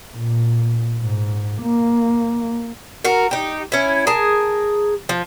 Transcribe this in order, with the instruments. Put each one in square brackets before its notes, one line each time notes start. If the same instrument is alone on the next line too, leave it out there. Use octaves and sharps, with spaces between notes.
[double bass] A#2
G#2
A#3
[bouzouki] F#4 A#4
D#4 G4
C#4 E4
G#4 A#4 A5
F3